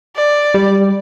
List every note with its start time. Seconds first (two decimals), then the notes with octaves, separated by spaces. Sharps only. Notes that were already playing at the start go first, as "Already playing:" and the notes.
0.16 D5
0.54 G3